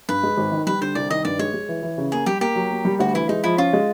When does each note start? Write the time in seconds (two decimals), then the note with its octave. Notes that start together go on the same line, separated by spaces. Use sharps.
0.09 G2 B4
0.23 G#3
0.37 G#1
0.52 D#3
0.67 G3 B4
0.81 D3 C5
0.95 C2 D5
1.10 D#3 D#5
1.25 G2 D5
1.39 G#3 C#5
1.54 G#3
1.69 E3
1.83 E3
1.98 C#3
2.12 A#3 G#4
2.26 G3 G4
2.41 A#3 G4
2.55 F#3
2.71 A#3
2.85 G3
2.99 D2 F#4
3.14 E3 E4
3.29 G#3 D#4
3.44 F3 E4
3.58 C#4 F4
3.73 G#3